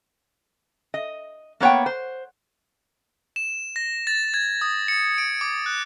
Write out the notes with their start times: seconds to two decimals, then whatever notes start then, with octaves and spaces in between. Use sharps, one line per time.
0.94 D#5
1.60 A#3 B3 C#5 F#5 G5
1.86 C5
3.36 E7
3.76 A#6
4.07 A6
4.34 G#6
4.61 D#6
4.88 C#7
5.18 D7
5.41 D6
5.66 F#6